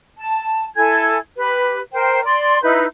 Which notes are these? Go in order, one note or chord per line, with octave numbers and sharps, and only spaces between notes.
A5
E4 A4 G#5 G#6
G4 B4
A#4 C5 G5
D5 C6
D#4 E4 B4 G6